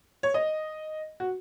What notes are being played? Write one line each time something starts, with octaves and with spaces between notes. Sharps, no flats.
C#5
D#5
F#4